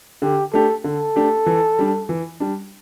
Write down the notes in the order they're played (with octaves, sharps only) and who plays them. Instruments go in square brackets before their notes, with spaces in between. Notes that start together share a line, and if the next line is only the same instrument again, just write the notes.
[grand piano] D3 [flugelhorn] G4
[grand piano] A3 D4 G4 [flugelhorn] A4
[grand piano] D3 [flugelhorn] A4
[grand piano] A3 D4 G4
E3
G3 D4
E3
G3 D4